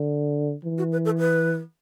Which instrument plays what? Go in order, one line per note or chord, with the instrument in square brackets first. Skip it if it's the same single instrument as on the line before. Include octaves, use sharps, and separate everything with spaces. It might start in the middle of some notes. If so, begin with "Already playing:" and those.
Already playing: [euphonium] D3
E3
[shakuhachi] F#4
B4
A4
B4